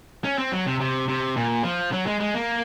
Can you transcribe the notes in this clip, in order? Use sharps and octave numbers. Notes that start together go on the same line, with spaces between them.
C#4
C4
F#3
C3
C3
C3
A#2
F3
F#3
G#3
G#3
A#3